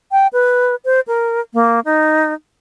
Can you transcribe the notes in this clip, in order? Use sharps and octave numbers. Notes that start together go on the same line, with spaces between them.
G5
B4
C5
A#4
A#3
D#4